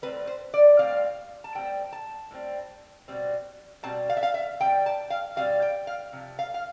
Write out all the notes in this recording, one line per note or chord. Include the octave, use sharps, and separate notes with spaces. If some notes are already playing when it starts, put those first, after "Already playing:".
A2 G3 C4 B4
C5
D5
A2 G3 C4 F5
A5
A2 G3 C4 G5
A5
A2 G3 C4
B2 G3 C4
B2 G3 C4 A5
F5
E5
F5
E5
B2 G3 C4 G5
A5
F5
B2 G3 C4 F5
G5
F5
C3 F3
F5
F5